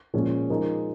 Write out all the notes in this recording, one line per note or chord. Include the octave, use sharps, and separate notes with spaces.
A#2 F3 G#3 C#4
F3 G#3 D#4 A#4